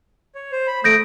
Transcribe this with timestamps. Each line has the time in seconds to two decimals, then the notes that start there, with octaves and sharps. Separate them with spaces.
0.35 C#5
0.52 C5
0.67 B5
0.84 A3 D#6 G6 A#6 D7